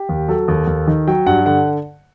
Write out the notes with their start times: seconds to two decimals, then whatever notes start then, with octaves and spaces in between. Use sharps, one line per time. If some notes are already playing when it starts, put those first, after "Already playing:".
Already playing: G4
0.09 D#2
0.28 F#3 A4
0.48 D#2
0.67 D#2
0.87 D#3
1.07 F#3 G5
1.26 G2 F#5
1.46 D3 F#5